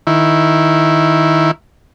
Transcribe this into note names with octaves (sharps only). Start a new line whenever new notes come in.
D#3 E4